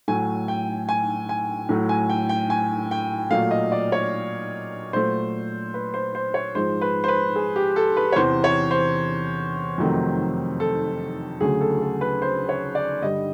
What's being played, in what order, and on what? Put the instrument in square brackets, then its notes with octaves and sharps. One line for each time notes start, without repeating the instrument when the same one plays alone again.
[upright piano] A2 F#3 A3 G#5
G5
G#5
G#5
A2 F#3 A3
G#5
G5
G5
G#5
G5
A#2 F#3 A3 F5
D#5
D5
C#5
A#2 F#3 A3 C5
B4
C5
C5
C#5
G#2 F3 G#3 C5
B4
C5
B4
G#4
G4
A4
B4
C#5
E2 C3 E3 C5
C#5
C5
F2 C3 D#3 F#3 A3
A4
D2 C#3 F#3 A3 G#4
A4
A4
B4
C5
C#5
D5
G2 D3 G3 D#5